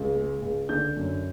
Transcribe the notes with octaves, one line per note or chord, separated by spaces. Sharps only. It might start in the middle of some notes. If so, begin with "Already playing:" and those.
Already playing: C#2
G#3
C#2
D3 G6
F#2